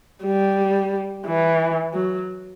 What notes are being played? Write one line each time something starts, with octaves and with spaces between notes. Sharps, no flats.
G3
E3
F#3